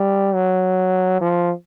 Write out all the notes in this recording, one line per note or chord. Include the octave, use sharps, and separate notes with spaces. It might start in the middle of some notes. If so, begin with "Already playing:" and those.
Already playing: G3
F#3
F3